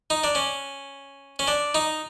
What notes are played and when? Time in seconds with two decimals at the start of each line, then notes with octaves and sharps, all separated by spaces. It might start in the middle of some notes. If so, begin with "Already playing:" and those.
0.10 D#4
0.24 D4
0.35 C#4
1.39 C#4
1.48 D4
1.74 D#4